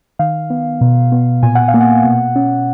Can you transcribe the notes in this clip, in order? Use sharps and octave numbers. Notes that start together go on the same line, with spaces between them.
D#3 F5
B3
B2
B3
A#2 G#5
F#5
F5
A#3
F#5
B2
C#4